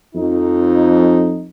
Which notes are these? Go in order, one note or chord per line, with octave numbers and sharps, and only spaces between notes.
F2 D#4